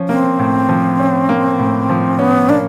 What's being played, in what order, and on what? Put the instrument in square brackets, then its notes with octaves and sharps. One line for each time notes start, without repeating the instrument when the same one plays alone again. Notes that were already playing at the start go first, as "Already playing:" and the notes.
Already playing: [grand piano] F3 C#4
[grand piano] A#3 [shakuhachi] C4
[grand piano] A2
F3
C#4
A#3
A2
F3
[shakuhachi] B3 [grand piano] C#4
[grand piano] A#3 [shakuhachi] D4